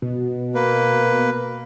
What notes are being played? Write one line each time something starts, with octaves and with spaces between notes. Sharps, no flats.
B2
A#3 B4